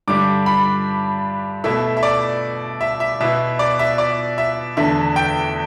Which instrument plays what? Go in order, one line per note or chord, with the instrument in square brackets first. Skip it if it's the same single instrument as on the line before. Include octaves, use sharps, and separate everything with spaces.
[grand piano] G2 D3 G3 D4 D6
B5
B2 A3 E4 E5
E5
D5
E5
E5
B2 B3 E4 E5
D5
E5
D5
E5
E2 D3 A3 D4 E5
G5